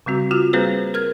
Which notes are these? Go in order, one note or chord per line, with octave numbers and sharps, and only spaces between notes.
C#3 G3 C4 F#4
F4 F#4 F6
G3 A#3 C4 G#4 B4 C5
A#4 F6 G#6